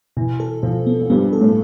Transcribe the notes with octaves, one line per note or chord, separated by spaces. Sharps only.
B2 E3
A4
B2 F3
B3
F3
G2 G3 B3
A4
A2 A3